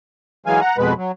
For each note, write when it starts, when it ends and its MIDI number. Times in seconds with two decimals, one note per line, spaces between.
0.46 0.60 52
0.46 0.60 54
0.46 0.60 56
0.46 0.60 77
0.46 0.60 80
0.61 0.77 78
0.61 0.77 82
0.78 0.93 41
0.78 0.93 47
0.78 0.93 56
0.78 0.93 71
0.97 1.12 54